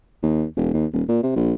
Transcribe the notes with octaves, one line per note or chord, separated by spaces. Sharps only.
D#2
E1
D#2
D#1
A#2
C3
A#1